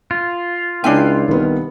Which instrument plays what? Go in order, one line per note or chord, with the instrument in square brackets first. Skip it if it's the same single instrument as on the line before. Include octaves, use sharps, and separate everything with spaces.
[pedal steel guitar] F4
[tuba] C#2 [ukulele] D4 E4 G#5 [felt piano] G5
[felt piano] C2 B3 [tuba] D#3